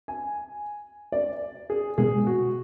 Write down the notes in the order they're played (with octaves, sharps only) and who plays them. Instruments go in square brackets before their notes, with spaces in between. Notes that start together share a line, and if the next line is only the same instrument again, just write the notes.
[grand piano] G#5
D5
G#4
[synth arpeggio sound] B2 G#3 B3 [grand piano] G#4
[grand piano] F#4